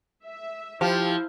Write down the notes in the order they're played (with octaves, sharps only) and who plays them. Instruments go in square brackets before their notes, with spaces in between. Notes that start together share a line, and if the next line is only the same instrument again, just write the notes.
[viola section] E5
[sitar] F3 [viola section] E4 C5 [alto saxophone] G4